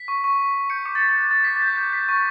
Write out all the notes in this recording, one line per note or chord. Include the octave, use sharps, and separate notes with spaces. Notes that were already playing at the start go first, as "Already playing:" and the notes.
Already playing: B6
C#6
C#6
C#6
C#6
G6 C#7
D6 C#7
A6
C#6 B6
A6
F#6 G6
D6 A6
D6 B6
A6
G6
G6
G6 B6
C#6